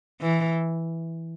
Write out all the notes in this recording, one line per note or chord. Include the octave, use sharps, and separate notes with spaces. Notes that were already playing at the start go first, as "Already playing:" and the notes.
E3